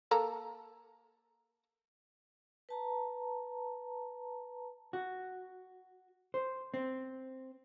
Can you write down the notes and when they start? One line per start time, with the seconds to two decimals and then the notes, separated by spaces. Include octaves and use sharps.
0.11 A#3 A4 A#5
2.69 B4 A5 A#5
4.93 F#4
6.34 C5
6.74 C4